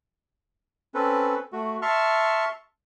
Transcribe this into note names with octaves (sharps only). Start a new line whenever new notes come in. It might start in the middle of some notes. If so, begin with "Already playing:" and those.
C4 C#4 A4 B4
A3 F#4
E5 A5 C6 C#6 F6